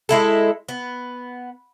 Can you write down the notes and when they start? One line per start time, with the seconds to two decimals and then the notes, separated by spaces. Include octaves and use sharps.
0.09 G#3 E4 A4
0.69 B3